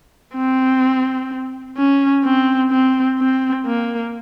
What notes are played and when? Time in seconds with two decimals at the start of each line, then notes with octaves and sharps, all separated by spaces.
0.35 C4
1.77 C#4
2.24 C4
2.71 C4
3.19 C4
3.66 A#3